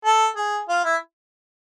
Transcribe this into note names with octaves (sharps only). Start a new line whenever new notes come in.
A4
G#4
F4
E4